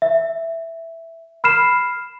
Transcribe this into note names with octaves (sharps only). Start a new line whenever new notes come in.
E5
B5 F6 C7 E7